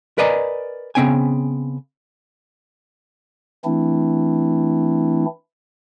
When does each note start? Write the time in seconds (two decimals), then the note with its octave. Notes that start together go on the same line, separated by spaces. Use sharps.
0.18 A#4 B4 D5 D#5 G#5 A#5
0.95 C#3 F#3 B3 C4 G5 G#5
3.65 E3 A3 C4 D4 E4